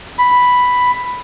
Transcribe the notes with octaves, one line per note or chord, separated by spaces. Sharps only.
B5